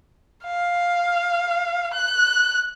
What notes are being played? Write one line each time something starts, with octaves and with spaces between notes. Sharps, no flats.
F5
F#6